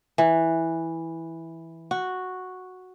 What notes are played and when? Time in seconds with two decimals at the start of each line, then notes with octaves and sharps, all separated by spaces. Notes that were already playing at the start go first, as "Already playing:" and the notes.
0.18 E3
1.91 F#4